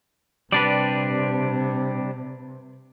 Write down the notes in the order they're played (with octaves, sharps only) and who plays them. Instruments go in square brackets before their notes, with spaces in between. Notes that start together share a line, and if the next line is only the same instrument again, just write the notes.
[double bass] C3 [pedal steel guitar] G3 D4 G4 [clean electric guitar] B4 D5